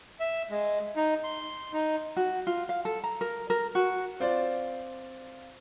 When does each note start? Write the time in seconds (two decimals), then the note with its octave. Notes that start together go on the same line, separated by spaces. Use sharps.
0.20 E5
0.50 G#3
0.96 D#4
1.24 C6
1.73 D#4
2.17 F#4
2.47 F4
2.69 F5
2.85 A4
3.04 A#5
3.21 A#4
3.50 A#4
3.75 F#4
4.20 C4 F4 C5 D5